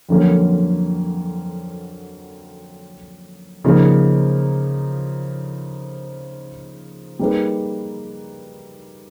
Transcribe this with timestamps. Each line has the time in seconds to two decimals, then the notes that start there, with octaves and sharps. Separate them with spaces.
0.09 F2 D3 F#3 A#3 C#4
3.64 C#3 F3 A#3 D#4
7.19 G3 A#3 D#4 G#4 B4